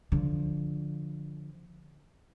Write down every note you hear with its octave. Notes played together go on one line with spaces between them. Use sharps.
D3 F3